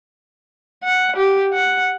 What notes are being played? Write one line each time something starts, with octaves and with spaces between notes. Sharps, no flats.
F#5
G4
F#5